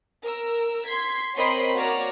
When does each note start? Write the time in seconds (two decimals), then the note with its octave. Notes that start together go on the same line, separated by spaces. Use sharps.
0.24 A#4 E6
0.85 C6 G#6 B6
1.35 C4 A#4 C#5 D#5 B5 C6
1.75 A#3 F#4 C#5 D5 A#5 F6